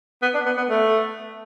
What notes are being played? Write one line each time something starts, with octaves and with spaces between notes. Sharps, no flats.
B3
D4
B3
B3
A3